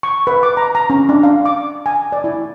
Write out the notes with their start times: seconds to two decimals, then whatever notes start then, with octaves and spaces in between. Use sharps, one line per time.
0.03 C#6
0.27 B4
0.43 D6
0.57 A#5
0.75 A#5
0.90 C#4
1.09 D4
1.23 F5
1.45 D6
1.86 G#5
2.12 D5
2.24 E4